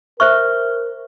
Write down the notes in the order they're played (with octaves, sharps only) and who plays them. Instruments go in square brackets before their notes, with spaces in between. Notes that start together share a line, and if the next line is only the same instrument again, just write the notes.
[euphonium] A#4 [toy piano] C5 E5 C#6 [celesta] F6